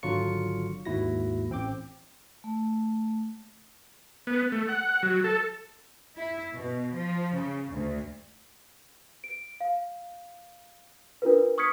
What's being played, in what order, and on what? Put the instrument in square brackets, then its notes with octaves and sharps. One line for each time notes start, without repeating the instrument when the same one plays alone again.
[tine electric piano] G#1 D3 F#3 F4 C#6 C#7
D#2 G#2 E4 F#4 A#6
A1 C4 G5 D6
[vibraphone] A3
[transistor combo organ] B3
A3
F#5
F#3
A4
[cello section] E4
B2
F3
C#3
D2
[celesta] D7
F5
D4 F4 A#4 B4
C#6 D#6 F6 G#6 B6 C#7